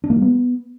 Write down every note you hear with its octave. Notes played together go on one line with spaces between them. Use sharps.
D4
A#3
G3
B3